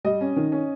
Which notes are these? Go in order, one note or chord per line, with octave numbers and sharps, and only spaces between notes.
G3 D#5
C#4
D#3
C#4